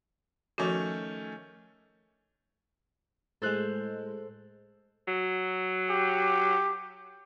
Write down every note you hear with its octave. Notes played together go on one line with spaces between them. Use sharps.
D#3 F3 A3 C#4 F#4
A2 G#3 A4 C5 F#6
F#3
G4